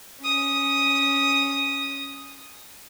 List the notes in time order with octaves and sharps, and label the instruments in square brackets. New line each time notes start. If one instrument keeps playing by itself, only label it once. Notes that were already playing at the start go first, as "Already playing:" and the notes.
[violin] C#4 D#6